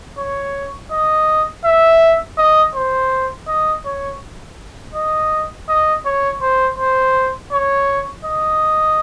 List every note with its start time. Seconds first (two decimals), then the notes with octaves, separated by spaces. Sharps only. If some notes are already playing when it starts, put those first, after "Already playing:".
0.18 C#5
0.91 D#5
1.65 E5
2.38 D#5
2.75 C5
3.48 D#5
3.85 C#5
4.94 D#5
5.69 D#5
6.06 C#5
6.42 C5
6.78 C5
7.52 C#5
8.25 D#5